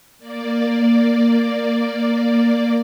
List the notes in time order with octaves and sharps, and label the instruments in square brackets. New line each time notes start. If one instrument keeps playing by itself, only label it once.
[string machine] A#3 D5